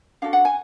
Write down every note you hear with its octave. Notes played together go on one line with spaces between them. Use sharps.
D4 F#4 A4 F5
F#5
G#5